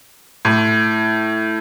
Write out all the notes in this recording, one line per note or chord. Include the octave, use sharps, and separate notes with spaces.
A2